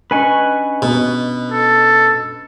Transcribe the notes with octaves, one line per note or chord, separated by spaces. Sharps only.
C#4 D4 B4 D#5 G#5 C#6
B2
A4